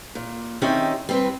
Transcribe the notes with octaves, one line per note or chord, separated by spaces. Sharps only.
A#2
D#3 C4 C#4 G4 D#5 E5
G3 C4 B4